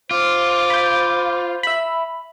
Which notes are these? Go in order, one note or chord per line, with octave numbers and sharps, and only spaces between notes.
F4 C5 D6
B5 G6
E5 B5